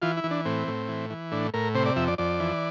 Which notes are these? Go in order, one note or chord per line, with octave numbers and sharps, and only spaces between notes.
E3 F4
E4
E3
D4
A2 C4
A2
E3
E3
A2 D4
A2 A#4
C3 C5
D5
F2 E5
D5
F2 D5
E3